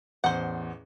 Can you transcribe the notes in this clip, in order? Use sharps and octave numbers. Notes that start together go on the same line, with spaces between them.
A1 E2 C5 F#5